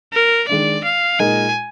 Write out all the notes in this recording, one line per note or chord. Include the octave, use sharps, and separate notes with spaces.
A#4
D#3 G#3 D4 D5
F5
A#2 G#3 D#4 A#4 G#5